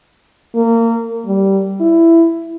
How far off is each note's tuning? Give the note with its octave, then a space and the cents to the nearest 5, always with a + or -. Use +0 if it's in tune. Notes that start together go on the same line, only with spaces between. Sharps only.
A#3 -25
G3 -15
E4 +10